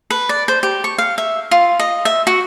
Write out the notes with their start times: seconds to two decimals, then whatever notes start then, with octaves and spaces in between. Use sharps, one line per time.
0.10 B4
0.29 D5
0.48 C5
0.63 G4
0.84 C#6
0.98 F5
1.18 E5
1.51 F4
1.79 D#5
2.05 E5
2.27 F#4